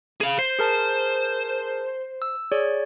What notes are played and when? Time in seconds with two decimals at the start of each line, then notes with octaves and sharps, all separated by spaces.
0.21 G#4 F5
0.39 C5 C7
0.59 G#4 A#4 A5
2.22 E6
2.51 G#4 C#5 D5